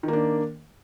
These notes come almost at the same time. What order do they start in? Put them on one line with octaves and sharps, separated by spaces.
D#3 A#3 D4